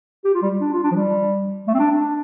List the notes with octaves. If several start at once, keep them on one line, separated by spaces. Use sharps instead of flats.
G4
F4
G3
D4
F4
D4
F3
G3
A3
C4
D4
D4